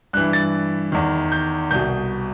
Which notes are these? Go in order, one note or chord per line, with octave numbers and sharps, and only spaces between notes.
G2 E3 F#6
A6
E2 D#3
G6
C2 B2 G6